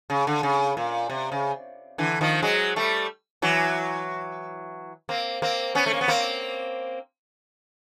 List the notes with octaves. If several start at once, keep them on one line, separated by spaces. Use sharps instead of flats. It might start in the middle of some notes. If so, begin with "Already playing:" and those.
C#3
D3
C#3
A#2
C3
C#3
D3 E3
D#3 F3
F#3 G#3
G3 A3
E3 F#3
A#3 C4
A#3 C4
B3 C#4
A3
A#3
B3
A#3 C4